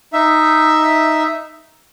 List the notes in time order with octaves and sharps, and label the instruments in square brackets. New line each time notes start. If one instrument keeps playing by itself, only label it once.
[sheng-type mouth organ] D#4 E5